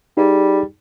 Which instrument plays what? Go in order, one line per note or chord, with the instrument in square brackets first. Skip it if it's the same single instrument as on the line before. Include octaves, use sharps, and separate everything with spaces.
[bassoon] G3 [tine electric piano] D#4 G#4